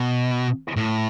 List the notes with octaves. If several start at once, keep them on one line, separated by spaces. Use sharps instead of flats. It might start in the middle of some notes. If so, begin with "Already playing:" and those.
Already playing: B2
A2